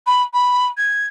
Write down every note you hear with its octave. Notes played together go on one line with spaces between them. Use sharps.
B5
B5
G#6